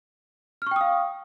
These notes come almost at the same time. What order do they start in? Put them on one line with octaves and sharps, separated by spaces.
F6 C#6 G5 D#6 F5